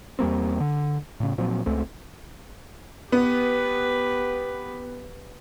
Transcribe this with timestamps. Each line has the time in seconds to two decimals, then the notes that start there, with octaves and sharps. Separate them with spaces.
0.19 E2 G3 A#3 C4
0.60 D3
1.20 A2 C#3
1.38 A#2 F3 F#3 C4
1.66 C#2 A3 C4
3.12 B3 G4 B4